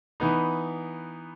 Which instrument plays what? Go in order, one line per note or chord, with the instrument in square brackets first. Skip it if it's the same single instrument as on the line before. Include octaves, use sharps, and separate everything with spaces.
[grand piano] E3 B3 D#4